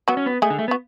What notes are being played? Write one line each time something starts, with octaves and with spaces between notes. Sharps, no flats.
F#3 B3 F#4
C#4
B3
G#3 A3 G#4
D3
A3
B3
F#4